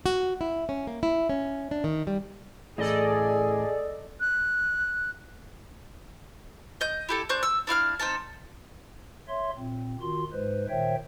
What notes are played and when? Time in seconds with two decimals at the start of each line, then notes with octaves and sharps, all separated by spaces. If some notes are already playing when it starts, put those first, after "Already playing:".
0.06 F#4
0.41 E4
0.69 C#4
0.87 A#3
1.03 E4
1.29 C#4
1.71 D4
1.84 D#3
2.07 G3
2.78 A2 E3 G#4 A4 D5 D#5
4.20 F#6
6.81 D#5 G6
7.09 E4 G4 A4
7.29 D4 C5 C#6 G6
7.43 E6
7.67 D4 E4 F5 F6
7.99 C4 D#4 A4 A5
9.28 C#5 E5 C6
9.57 A#2 C4
10.00 D#3 F4 F#4 C6
10.33 G#2 G#3 B4 C5
10.69 A#2 D#3 C5 C#5 E5 G5